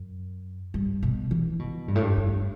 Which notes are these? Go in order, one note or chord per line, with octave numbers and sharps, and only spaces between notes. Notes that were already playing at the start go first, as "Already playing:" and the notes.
Already playing: F#2
G2
B2
E3
B2
G2
A2
G2
G2